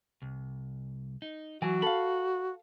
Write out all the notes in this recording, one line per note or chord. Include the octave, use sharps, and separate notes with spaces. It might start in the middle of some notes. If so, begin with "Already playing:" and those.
C2
D#4
E3 F#3 F#4 G#5
A4 F5 B5